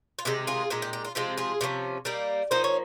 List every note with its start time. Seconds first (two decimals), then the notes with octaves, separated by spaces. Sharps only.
0.19 F4
0.25 C3 D#3 G#3 D#4 G4
0.47 F4 G#4
0.70 A#2 G#3 D#4 G4
0.82 G4
0.93 G4
1.05 F4
1.15 C3 F3 G#3 C4 F4
1.37 F4 G#4
1.61 C3 F3 A#3 C#4
2.05 G3 A#3 D#4
2.51 F3 A#3 D#4 C5
2.64 C#5